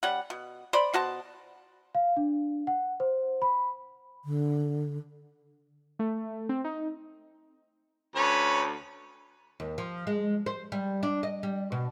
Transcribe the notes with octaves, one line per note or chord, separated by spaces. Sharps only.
G3 C#4 F#5
B2
C5 D5 B5
B2 F#4 C5 A5
F5
D4
F#5
C5
B5
D3
A3
C4
D#4
D2 C#4 B4 C#5
D#2
F3
G#3
C5
G3
D4
D#5
G3
B2